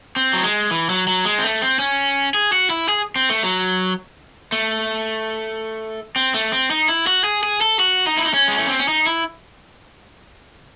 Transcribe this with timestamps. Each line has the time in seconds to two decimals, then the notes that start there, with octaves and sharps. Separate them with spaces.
0.16 C4
0.33 F#3
0.43 G#3
0.71 E3
0.90 F#3
1.07 F#3
1.25 G#3
1.38 C4
1.44 A3
1.62 C4
1.79 C#4
2.34 G#4
2.52 F#4
2.70 E4
2.89 G#4
3.16 C4
3.30 A3
3.43 F#3
4.52 A3
6.16 C4
6.34 A3
6.52 C4
6.71 D#4
6.88 E4
7.07 F#4
7.24 G#4
7.43 G#4
7.61 A4
7.79 F#4
8.07 D#4
8.17 E4
8.25 D#4
8.34 C#4
8.48 G#3
8.58 A3
8.68 C4
8.79 C#4
8.88 D#4
9.06 E4